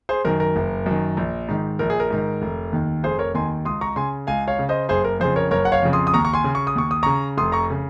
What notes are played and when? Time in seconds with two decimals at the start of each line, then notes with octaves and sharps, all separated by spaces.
0.09 G#4 C5
0.25 F#2 D#3 A#4
0.40 A#4
0.56 F#1
0.86 F#2 D#3
1.17 A#1
1.48 G#2 D#3
1.79 A#1 A#4
1.90 G#4
2.00 A#4
2.10 G#2 D#3
2.42 F1
2.73 D#2 D#3
3.03 F1 G#4 C5
3.19 A#4 C#5
3.34 D#2 D#3 G#5 C6
3.65 C#2 C6 D#6
3.81 A#5 C#6
3.96 C#3 G#5 C6
4.27 C#2 F5 G#5
4.48 C#5 F5
4.59 C#3
4.69 C5 D#5
4.89 F#1 G#4 C5
5.04 A#4
5.20 F2 C#3 G#4 C5
5.36 A#4 C#5
5.51 F#1 A#4 C#5
5.65 F#5
5.72 C#5 F5
5.83 F2 C#3
5.93 C6 D#6
6.07 D#6
6.14 D#2 A#5 C#6
6.25 C#6
6.33 G#5 C6
6.44 C#3
6.55 C#6
6.67 D#6
6.76 D#2 C#6
6.91 D#6
7.03 C#3 A#5 C#6
7.37 F1 C6 D#6
7.52 A#5 C#6
7.70 C#3